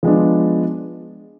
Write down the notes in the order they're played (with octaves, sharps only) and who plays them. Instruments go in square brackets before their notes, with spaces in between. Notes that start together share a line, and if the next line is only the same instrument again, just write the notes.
[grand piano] F3 G#3 B3 D4